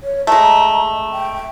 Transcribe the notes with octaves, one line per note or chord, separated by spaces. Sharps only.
C#5
G#3 A3 A#5
G5